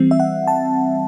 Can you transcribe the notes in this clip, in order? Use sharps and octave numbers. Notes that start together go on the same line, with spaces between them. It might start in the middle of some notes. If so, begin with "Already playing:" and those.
Already playing: E3 G3 C4
E5
F#5
A5